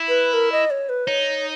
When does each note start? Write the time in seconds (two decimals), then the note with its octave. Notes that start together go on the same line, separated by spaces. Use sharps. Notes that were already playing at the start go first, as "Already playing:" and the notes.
Already playing: E4
0.08 B4
0.34 A#4
0.52 D#5
0.70 C#5
0.89 B4
1.07 D#4 C#5